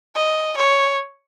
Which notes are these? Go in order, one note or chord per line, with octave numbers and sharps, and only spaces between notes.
D#5
C#5